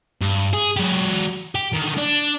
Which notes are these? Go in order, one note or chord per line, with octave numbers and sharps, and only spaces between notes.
G2
G#4
F#3 G4
G4
D3 D#3
D4